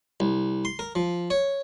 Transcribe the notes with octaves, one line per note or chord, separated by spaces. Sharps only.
C2
C6
A#4
F3
C#5